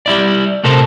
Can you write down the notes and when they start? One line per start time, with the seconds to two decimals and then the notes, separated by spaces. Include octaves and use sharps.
0.06 G3 E4 D5
0.64 A2 C3 A4 A#4 C5